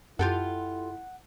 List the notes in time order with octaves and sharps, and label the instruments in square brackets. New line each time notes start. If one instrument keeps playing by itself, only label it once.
[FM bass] F#2 [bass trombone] E4 [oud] F4 G4 A4 [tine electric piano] F#5